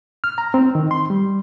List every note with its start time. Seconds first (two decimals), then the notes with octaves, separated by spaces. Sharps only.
0.24 F6
0.38 A#5
0.54 C4
0.75 D#3
0.91 C6
1.10 G3